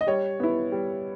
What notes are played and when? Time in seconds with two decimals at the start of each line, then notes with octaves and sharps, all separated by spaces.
0.01 D#5
0.07 G3 C#5
0.40 B3 E4
0.72 G3